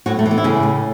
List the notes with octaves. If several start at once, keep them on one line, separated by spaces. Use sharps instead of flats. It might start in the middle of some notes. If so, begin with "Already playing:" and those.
A2 F#3 F#4
A3
E3
B3
E4
A2 C#3 C#4
A3